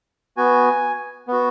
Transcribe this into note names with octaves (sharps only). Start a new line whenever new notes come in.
B3 F#4 G#5
B3 F#4